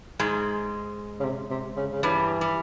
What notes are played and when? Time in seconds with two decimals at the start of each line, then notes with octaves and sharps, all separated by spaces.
0.19 G#2 G#3
1.20 C#3
1.24 C3
1.50 C3
1.76 C#3
1.91 C#3
2.03 G2 E3 G3
2.41 G3